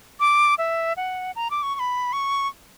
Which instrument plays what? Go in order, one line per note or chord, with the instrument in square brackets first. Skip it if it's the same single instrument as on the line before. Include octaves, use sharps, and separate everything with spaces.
[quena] D6
E5
F#5
A#5
D6
C#6
C#6
B5
C#6